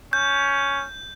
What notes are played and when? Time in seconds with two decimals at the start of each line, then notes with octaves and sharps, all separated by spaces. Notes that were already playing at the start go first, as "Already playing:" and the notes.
0.13 C#4 G6